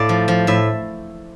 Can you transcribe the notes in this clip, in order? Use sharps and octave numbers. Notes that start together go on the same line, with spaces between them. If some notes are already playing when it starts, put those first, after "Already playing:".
Already playing: A2 D5 F5
F3
F3
A2 E5